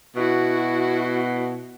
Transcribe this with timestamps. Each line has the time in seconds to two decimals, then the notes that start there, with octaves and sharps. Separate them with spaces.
0.16 B2 E4 F#4